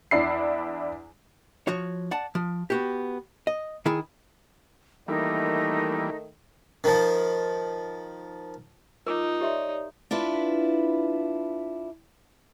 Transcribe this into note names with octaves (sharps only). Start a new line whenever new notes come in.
E2 D4 E4 C7
F3 F#4 C#5
D5 F#5 A5
F3
B3 F#4 G4
D#5
D#3 E4 G#4
D#3 E3 G3 A3 A#3 D#4
D#3 F3
D#4 F4 A#4 D6
G4 C#5 D5 E5 C6
D4 E4 F4 B4